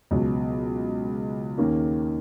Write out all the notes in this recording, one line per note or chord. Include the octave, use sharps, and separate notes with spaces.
C#2 B2 F#3
D#2 D#3 A#3 C#4